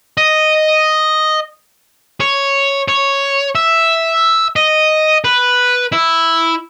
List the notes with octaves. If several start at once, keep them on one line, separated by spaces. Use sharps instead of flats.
D#5
C#5
C#5
E5
D#5
B4
E4